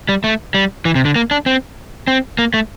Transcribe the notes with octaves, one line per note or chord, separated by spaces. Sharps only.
G3
A3
G3
E3
C3
D3
A#3
D4
C4
C4
A#3
A3